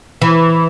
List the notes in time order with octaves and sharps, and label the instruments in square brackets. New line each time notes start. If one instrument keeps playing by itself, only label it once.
[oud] E3